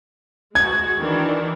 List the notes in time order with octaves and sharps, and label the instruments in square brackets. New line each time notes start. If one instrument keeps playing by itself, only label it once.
[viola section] G#3 F#4 [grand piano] G#6
[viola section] D#3 E3 D4